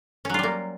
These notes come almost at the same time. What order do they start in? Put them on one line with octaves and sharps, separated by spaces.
C#4 F#3 F4 G3 A#3